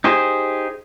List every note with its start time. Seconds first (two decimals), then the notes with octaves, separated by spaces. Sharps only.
0.04 D#4 G4 G#4 C5